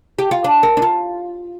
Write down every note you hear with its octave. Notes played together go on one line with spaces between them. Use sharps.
G4
F4
D4
A#4
D4
F4